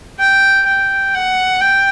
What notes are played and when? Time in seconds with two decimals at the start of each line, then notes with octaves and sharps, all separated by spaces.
0.20 G5
0.67 G5
1.15 F#5
1.61 G5